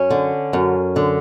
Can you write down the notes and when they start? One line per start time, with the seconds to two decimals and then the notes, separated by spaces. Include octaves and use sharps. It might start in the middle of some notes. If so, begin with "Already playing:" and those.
Already playing: F#2 C#4
0.10 D3
0.53 F#2
0.96 D3